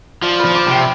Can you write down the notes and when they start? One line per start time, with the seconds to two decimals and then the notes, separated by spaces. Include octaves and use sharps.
0.23 F3 D5
0.39 B4
0.45 F3
0.55 D6
0.67 C3 G5